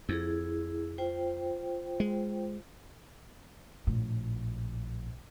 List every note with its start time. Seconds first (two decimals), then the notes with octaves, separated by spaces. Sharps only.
0.09 F2 E4 G#4
0.98 F4 C5 G5
2.00 G#3
3.87 A#1 A2